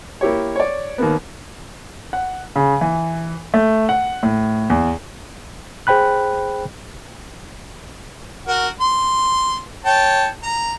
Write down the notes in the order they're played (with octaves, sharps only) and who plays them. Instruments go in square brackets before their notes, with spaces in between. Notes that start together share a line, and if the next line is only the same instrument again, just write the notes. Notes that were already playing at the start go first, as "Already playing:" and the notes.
[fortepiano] A#3 E4 G4 C#5
C#5 D5
D#2 A#3 B3
[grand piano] F#5
C#3
E3
A3
F#5
A2
E2
[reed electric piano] G#4 C5 G5 B5 F#6
[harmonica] F#4 A#4
C6
C#5 G5 A5
A#5